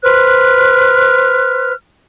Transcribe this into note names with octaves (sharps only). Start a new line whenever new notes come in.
B4 C5 F6 F#6